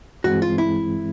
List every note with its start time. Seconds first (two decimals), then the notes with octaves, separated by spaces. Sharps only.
0.24 G2 E3 G#3 C4 F#4
0.42 F4
0.58 E4